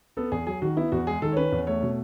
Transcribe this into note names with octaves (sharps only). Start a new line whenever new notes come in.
B3 A4
E2 G#4
F#3 G#4
D#3 F#4
B3 E4
E2 F#4
G#3 G#4
D#3 A4
C#5
C#4 B4
E2
A3 C#5
B2